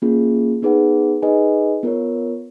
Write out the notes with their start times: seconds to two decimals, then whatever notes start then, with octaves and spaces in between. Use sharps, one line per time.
0.02 A#3 C#4 F4 G#4
0.62 B3 D#4 G#4 B4 F#5
1.22 D#4 G#4 B4 D#5 G#5
1.83 B3 F4 A#4 C#5